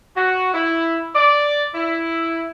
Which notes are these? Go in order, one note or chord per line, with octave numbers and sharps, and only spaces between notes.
F#4
E4
D5
E4